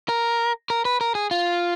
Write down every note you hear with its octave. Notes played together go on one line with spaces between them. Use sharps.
A#4
A#4
B4
A#4
G#4
F4